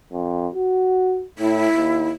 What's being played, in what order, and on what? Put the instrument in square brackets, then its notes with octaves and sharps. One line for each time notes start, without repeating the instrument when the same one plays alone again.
[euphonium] F2
F#4
[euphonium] A2 [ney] E4
[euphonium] D#2